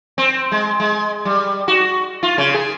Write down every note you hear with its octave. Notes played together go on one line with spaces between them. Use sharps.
C4
G#3
G#3
G3
F#4
F4
C#3
G#4